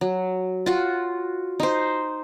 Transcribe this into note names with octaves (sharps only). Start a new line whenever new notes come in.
F#3
F4 F#4
D#4 C5